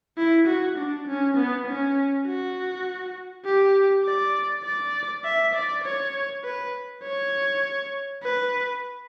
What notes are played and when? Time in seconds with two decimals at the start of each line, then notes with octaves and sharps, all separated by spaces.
0.17 E4
0.47 F#4
0.78 D4
1.07 C#4
1.37 B3
1.66 C#4
2.26 F#4
3.45 G4
4.04 D5
4.64 D5
5.24 E5
5.55 D5
5.84 C#5
6.44 B4
7.03 C#5
8.23 B4